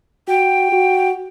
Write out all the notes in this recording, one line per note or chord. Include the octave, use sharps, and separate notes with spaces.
F#4 G5
F#4